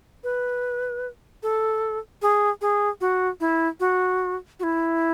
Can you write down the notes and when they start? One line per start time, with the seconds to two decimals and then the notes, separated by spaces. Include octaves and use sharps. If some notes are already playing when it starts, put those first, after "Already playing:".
0.24 B4
1.43 A4
2.22 G#4
2.61 G#4
3.01 F#4
3.40 E4
3.80 F#4
4.59 F#4
4.63 E4